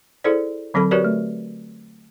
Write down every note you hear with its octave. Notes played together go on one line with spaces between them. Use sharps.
E4 G#4 A4 C5 D5
D3 F#3 C4 A4 B5
F#4 G4 A#4 B4 C#5 D5
A3